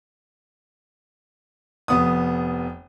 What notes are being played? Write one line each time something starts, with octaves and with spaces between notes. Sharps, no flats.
F1 B3 D#6